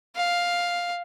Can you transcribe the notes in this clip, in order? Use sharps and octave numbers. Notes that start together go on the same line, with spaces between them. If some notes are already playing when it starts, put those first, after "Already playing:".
F5